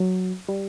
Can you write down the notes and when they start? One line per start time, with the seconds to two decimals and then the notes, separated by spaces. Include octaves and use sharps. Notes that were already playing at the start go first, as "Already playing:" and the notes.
Already playing: F#3
0.49 G3